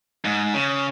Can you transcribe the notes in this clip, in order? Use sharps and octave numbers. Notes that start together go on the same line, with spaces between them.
G#2
C#3